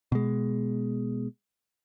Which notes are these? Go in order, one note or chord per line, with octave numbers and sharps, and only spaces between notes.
B2 G#3